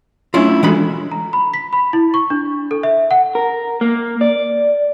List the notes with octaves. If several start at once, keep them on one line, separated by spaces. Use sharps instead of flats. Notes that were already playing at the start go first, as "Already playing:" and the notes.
F#3 A3 C#4 D4 E4 F4
E3 G#3 D4 F#4 A4 B5
A#5
B5
B6
B5
E4
C#6
D4
A4
E5
F#5
A#4
A#3
D5